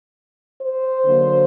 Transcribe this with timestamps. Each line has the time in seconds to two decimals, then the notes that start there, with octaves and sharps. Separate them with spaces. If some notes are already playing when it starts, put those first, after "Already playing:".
0.61 C5
1.04 D3 F#3 A#3